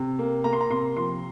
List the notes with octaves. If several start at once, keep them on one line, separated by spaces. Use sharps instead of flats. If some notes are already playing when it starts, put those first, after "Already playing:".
Already playing: C3
A#3
A#3 A#5
C6
A#5
C3 C6
F3 C6